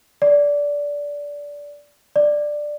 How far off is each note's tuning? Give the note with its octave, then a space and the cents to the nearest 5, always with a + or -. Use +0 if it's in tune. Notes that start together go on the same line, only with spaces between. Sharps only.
D5 -15
D5 +10